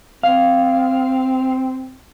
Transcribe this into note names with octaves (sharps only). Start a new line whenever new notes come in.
C4 F5